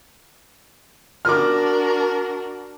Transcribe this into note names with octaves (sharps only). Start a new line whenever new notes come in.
D4 F#4 A#4 D6 F6